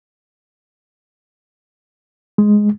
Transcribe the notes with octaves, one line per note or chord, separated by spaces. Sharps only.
G#3